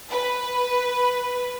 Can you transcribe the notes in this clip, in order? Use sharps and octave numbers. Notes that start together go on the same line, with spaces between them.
B4